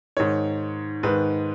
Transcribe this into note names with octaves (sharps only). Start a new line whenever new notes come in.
G#2 D#3 C#5
G#2 D#3 B4